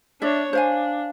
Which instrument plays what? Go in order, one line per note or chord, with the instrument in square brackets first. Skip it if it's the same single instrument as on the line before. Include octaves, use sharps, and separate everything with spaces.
[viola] D4 C#5 [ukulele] D5 E5
[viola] D4 [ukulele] C5 F5 G#5